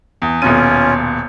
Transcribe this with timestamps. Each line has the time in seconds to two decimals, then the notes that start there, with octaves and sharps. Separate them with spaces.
0.22 E2
0.42 D#1 B2 C#4 F4 D#7